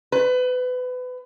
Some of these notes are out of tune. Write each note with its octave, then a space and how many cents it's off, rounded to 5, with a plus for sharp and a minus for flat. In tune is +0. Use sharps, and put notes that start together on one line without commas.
B4 +30